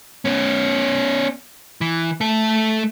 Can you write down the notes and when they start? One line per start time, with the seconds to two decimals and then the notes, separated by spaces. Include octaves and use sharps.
0.25 B3 C#4
1.81 E3
2.21 A3 A4